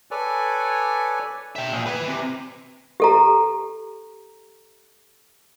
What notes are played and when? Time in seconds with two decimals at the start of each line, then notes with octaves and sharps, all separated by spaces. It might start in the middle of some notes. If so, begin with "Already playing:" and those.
0.11 A4 B4 C#5 D5 G#5
1.55 E5 G5
1.73 A#2 G#4
1.86 B4 G#5
2.08 C3
3.00 G4 A4 A#5